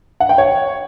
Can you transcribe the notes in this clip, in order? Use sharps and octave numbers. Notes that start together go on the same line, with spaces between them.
F#5
G5
C#5